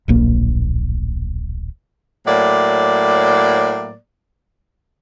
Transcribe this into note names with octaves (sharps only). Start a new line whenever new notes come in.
D1 A#1 A#3
A2 F#3 A#3 D5